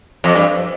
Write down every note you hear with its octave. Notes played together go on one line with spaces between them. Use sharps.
F2
G2